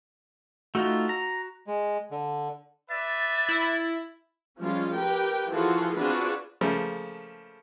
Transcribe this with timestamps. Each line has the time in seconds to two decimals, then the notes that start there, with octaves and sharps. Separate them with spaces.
0.75 A3 D#4 F4 F#4
1.09 A#5
1.67 G#3
2.11 D3
2.89 B4 D5 E5 A6
3.49 E4
4.60 F3 G3 G#3 C#4 F4
4.96 G4 A#4 B4 G5
5.49 E3 F3 F4 F#4 G#4 A4
5.95 C4 D4 F4 F#4 G#4 B4
6.61 C#3 F3 A3 A#3